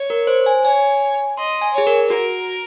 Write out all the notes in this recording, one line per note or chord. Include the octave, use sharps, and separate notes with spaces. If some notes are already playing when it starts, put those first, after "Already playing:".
Already playing: C#5
A#4
C5
G#5
C#5 G#5
D#5 C6
G#5
G#4 C#5
A#4
F#4 A#4